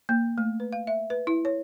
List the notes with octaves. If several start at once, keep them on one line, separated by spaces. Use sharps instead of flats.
A#3
A3
B4
F5
E5
B4
E4
C#5